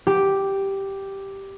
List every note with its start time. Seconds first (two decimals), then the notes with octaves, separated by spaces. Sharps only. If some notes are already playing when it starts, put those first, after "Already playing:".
0.07 G4